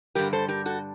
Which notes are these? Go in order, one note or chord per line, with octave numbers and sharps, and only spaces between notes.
G2 D3 G3 G4 A#4
A4 C5
G4 A#4
F#4 A4